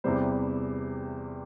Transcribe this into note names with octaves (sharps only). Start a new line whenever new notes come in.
E2 C3 E3 G3 C5